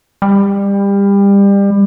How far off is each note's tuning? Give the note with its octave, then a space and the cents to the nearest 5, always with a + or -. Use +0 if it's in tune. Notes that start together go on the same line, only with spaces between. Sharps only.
G3 +25